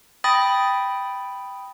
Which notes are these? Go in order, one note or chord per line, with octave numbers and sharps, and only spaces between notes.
G5 B5 D#6 A6 A#6